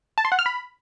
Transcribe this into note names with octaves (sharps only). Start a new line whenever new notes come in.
A5
C6
F#5
F6
B5